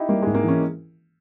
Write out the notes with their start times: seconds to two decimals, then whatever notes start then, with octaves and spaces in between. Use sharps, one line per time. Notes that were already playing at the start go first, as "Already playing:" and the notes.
Already playing: D#4 E4 G4
0.09 G3 A#3
0.22 G#3
0.27 G#2
0.35 A#3
0.43 E3 C#4